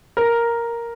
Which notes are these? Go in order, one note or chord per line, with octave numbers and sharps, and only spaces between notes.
A#4